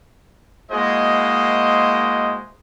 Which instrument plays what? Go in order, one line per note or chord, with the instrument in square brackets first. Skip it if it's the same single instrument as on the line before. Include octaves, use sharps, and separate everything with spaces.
[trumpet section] G#3 A#3 E4 F#4 C5 D#5